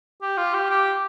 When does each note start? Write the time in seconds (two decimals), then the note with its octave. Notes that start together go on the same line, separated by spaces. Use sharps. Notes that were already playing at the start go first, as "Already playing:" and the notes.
0.22 G4
0.37 F4
0.54 G4
0.70 G4